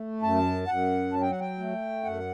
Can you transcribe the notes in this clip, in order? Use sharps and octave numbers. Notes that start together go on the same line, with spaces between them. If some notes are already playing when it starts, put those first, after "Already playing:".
Already playing: A3
F#2 A5
F#2 F#5
F#3 A5
G5
F#5
G5
A3
F#2 F#5